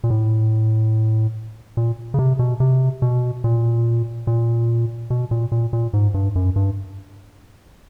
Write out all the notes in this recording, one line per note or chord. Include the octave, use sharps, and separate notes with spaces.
A#2
A2
A#2
C#3
C3
B2
C3
B2
A#2
A#2
B2
A#2
A#2
A#2
G#2
G2
F#2
G2